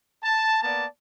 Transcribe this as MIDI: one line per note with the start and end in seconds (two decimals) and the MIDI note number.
0.23 0.63 81
0.63 0.85 58
0.63 0.85 59
0.63 0.85 74
0.63 0.85 81